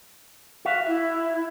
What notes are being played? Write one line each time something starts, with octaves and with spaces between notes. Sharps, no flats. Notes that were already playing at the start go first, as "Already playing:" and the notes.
F#4 E5 F5
E4 E5